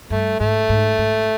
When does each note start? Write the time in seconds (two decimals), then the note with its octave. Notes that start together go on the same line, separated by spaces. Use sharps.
0.10 G2 A3
0.40 G#2 A3
0.69 G#2
0.98 G#2